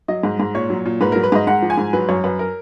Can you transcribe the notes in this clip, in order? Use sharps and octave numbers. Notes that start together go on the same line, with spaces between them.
F#3 D#5
G#2
G#2
A#2 C#5
F#3
A#2
G#2 B4
F#3 A#4
B4
G#2 D#5
G#2 F#5
F3
G#5
G#2
F#3 B4
F#2 C#5
F#2 B4
A#4